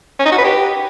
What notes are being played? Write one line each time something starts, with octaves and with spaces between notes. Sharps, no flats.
C#4
D#4
F#4
B4
G4